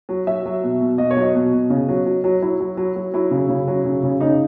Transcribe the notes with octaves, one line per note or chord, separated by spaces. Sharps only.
F#3
F#3 E5
F#3
B2
B2
B2 D#5
C#5
F#3 D#5
B2
B2
C#3
F#3
F#3
F#3
F#3 E4
F#3
F#3
F#3
F#3 E4
C#3
C#3
F#3
C#3
C#3
C#3 D#4